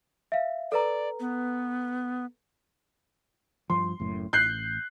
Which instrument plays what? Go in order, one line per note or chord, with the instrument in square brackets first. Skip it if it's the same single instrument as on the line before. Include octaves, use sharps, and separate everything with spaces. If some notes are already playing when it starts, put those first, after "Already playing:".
[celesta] E5 F5
[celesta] A4 B4 A#5 [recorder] D5
[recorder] B3
[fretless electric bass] G2 F3 [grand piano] C6
[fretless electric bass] F#1 F#2 A2
[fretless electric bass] A1 [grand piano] F#6 G6 C7